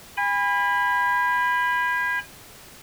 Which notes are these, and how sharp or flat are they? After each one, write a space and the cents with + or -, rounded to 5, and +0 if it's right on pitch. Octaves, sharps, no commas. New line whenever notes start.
G#5 -40 B5 +0